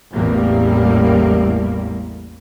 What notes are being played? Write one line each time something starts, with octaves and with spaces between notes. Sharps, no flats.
A1 E2 G3 A#3